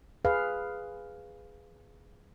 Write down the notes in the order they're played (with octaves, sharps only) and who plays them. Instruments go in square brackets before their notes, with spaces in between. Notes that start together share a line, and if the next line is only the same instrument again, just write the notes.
[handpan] G#4 B4 F5